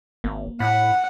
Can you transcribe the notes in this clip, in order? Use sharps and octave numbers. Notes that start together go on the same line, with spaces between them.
G#1 A#3
A2 F#5 B5